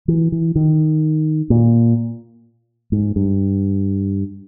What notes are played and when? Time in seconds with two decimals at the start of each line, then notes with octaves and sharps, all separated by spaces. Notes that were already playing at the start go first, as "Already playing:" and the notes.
0.08 E3
0.32 E3
0.55 D#3
1.50 A#2
2.92 G#2
3.16 G2